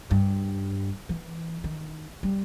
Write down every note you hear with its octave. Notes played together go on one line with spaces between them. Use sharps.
G2
E3
D#3
G3